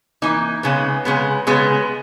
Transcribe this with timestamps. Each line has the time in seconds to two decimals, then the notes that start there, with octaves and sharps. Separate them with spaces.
0.22 E3 A#3 D#4
0.63 C#3 G#3 B3
1.05 C#3 G#3 B3
1.47 C#3 G#3 B3